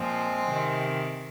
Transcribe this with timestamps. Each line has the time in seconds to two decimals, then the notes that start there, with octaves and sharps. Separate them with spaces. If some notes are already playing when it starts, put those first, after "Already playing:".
Already playing: A#2 F3 G#3 C4
0.48 C3 D#3